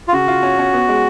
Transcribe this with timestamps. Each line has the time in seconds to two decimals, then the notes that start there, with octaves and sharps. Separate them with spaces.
0.08 F4
0.12 C#3 F#4
0.28 F4
0.43 C#4
0.59 C#4
0.73 B3
0.89 G#3